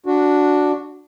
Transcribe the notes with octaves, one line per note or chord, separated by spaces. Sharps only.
D4 F#4